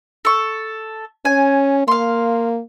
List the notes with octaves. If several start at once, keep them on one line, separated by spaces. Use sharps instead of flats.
A4 C#6
C#4 G#5
A#3 F5 C6